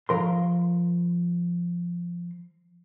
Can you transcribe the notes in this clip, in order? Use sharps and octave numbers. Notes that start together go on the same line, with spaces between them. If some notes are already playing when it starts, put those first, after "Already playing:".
F3 A#4 C6